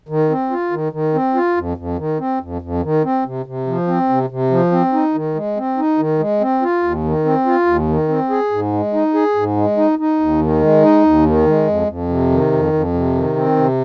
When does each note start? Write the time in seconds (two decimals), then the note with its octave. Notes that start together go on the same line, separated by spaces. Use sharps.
0.09 D#3
0.30 C4
0.50 F4
0.71 D#3
0.92 D#3
1.14 C4
1.35 F4
1.57 F2
1.77 F2
1.98 D#3
2.19 C4
2.41 F2
2.62 F2
2.83 D#3
3.04 C4
3.25 C3
3.46 C3
3.67 F3
3.87 C4
4.09 C3
4.30 C3
4.51 F3
4.72 C4
4.93 D#4
5.14 D#3
5.35 G#3
5.57 C4
5.77 D#4
5.98 D#3
6.19 G#3
6.40 C4
6.62 F4
6.83 D#2
7.04 D#3
7.25 C4
7.46 F4
7.67 D#2
7.89 D#3
8.09 C4
8.30 G#4
8.51 G#2
8.73 G#3
8.93 D#4
9.14 G#4
9.35 G#2
9.56 G#3
9.77 D#4
9.99 D#4
10.20 D#2
10.41 D#3
10.62 G#3
10.83 D#4
11.03 D#2
11.26 D#3
11.47 G#3
11.67 F2
11.88 F2
12.09 C3
12.31 D#3
12.52 F2
12.73 F2
12.94 C3
13.15 D#3
13.36 C4
13.56 C3